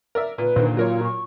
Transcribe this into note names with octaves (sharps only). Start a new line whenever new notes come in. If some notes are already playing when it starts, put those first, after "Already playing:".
A#4 D5 E5
A#2 B4
A#2 D3 D#3 C5
F#3 F4 A#4 C#5
C#6